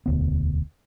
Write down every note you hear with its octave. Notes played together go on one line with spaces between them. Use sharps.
E1 D2 B3